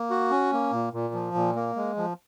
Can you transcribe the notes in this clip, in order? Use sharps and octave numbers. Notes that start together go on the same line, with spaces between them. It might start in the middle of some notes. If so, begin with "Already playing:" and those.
Already playing: A#3
F#4
C#4
A#3
A#2
A#2
F3
A#2
A#3
G#3
F3